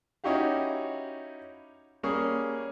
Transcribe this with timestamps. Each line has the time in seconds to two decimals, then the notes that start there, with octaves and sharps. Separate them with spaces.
0.24 C#4 D#4 E4 F#4 G4 F5
2.03 G3 A#3 C#4 G#4